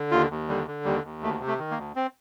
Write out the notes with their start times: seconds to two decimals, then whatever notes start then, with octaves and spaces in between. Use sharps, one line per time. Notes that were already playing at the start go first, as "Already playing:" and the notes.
Already playing: D3
0.11 D#2 F4
0.30 D#2
0.49 D3 G3
0.67 D3
0.85 D#2 G3
1.04 D#2
1.23 D2 A3
1.40 C3
1.47 A3
1.59 D#3
1.71 A#3
1.78 D2
1.96 C4